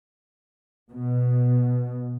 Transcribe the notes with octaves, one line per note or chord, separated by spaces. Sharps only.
B2